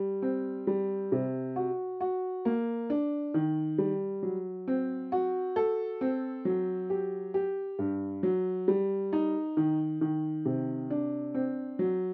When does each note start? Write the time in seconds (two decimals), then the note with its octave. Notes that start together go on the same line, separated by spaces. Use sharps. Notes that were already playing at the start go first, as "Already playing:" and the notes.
Already playing: G3
0.22 C4
0.67 G3
1.12 C3
1.56 F#4
2.01 F#4
2.45 A#3
2.90 D4
3.34 D#3
3.78 G3
4.23 F#3
4.68 C4
5.12 F#4
5.56 A4
6.01 C4
6.45 F#3
6.90 G4
7.34 G4
7.79 G2
8.23 F#3
8.68 G3
9.13 D#4
9.57 D#3
10.01 D#3
10.45 C3
10.90 D4
11.34 C4
11.79 F#3